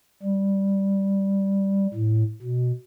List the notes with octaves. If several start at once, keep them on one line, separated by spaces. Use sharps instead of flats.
G3
A2
B2